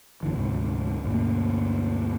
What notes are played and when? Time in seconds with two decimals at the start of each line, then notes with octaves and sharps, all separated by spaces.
0.23 F#2 D3 E3
0.36 D2 G#2 C3
1.04 D2 G2 B2 A#3